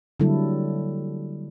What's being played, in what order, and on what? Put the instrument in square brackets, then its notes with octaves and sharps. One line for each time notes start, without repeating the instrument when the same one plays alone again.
[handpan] D3 F#3 G3 A#3 E4 A4